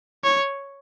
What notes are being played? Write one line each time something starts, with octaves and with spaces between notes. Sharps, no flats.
C#5